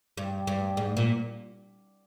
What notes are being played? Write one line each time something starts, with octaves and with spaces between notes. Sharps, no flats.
G2
G2
G#2
A#2